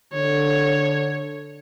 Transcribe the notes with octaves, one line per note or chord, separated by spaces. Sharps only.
D3 C#5